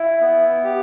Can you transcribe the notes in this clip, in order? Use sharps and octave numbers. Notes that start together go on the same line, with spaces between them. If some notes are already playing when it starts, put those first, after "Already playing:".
Already playing: E4
B3
G4